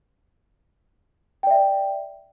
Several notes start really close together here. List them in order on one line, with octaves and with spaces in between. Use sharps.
G5 D5 E5